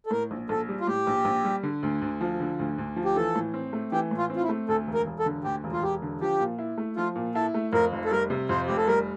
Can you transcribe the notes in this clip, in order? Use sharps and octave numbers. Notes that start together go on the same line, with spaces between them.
A4
A2 A#4
A#1
A#1 A4
G3
F4
A2 G4
A#1
A#1
G3
D3
D2
D2
F3
D3
D2
D2
F3
G4
E3 A4
A2
C4
A3
E3 G4
A2
F4
C4
F4
E4
A3
D2 A4
E1
A#4
E1
A4
D3
D2 G4
E1
F4
E1 G4
D3
F3 G4
A#2
E4
A3
F3 F4
A#2
E4 A4
A3
F2 A#4
F1
A4
G3 A#4
C3
F2 C5
F1 G4
A4
G3 A#4